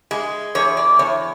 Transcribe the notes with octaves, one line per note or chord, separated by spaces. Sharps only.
G#3
E2 C#5
D5
E2 C#5